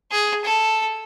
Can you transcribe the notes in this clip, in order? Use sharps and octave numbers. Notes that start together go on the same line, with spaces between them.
G#4
A4